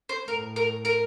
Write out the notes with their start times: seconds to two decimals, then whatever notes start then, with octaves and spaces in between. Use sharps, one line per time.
0.09 C5
0.28 A2 A#4
0.56 A#4
0.85 A#4